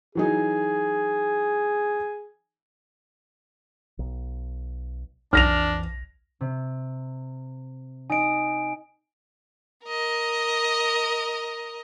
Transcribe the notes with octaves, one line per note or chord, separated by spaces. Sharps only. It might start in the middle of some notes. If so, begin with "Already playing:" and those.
E3 F#3 D#4 G#4
B1
B1 F2 E3 D4 F6 A#6 F7
C3
D#4 G#5 A#6 D7
A#4 D#5